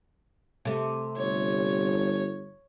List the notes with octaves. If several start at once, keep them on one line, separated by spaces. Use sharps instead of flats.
C3 A3
G1 C#5